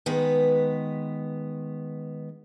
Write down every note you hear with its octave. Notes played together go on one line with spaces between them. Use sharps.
D#3 G#3 B3 B4